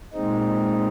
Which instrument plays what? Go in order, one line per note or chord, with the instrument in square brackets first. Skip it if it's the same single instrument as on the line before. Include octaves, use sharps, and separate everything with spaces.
[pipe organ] A#2 G#3 C4 D#4